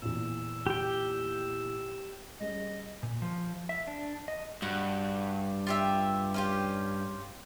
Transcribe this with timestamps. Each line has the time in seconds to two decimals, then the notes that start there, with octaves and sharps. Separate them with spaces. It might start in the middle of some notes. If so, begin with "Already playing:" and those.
0.02 E2 A#2 E6
0.67 G4 G5
2.40 G3 C#4 G#4 D#5
3.03 A#2
3.22 F3
3.69 E5
3.87 D4
4.28 D#5
4.62 G2 F#4
5.67 F4 G4 E5
6.34 C#4 F4 G4